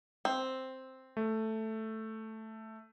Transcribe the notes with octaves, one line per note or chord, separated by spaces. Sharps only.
C4
A3